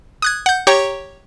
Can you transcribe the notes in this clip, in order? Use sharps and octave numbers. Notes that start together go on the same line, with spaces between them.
D#6 F#6 G#6
F#5 G6
G4 C#5 G5 A#5 C#6